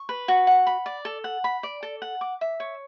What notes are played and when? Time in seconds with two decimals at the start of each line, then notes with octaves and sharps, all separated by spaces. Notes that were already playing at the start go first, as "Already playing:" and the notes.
Already playing: C#6
0.09 B4
0.28 F#4
0.47 F#5
0.67 B5
0.86 D5
1.05 A4
1.24 F#5
1.44 B5
1.63 D5
1.83 A4
2.02 F#5
2.21 D6
2.41 E5
2.60 C#5